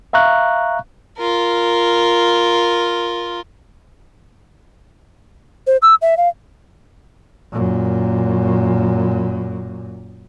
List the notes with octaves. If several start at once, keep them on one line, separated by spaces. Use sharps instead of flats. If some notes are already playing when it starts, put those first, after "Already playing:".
E5 F5 A#5 C#6 F#6
F4 A#4
C5
E6
E5
F5
F#2 A#2